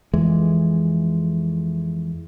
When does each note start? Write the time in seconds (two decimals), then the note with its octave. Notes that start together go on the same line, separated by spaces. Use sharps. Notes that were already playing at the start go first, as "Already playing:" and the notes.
0.14 F2 E3 G#3